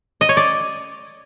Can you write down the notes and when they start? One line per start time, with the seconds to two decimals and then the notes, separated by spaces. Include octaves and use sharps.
0.21 D#5
0.29 C#5
0.37 D5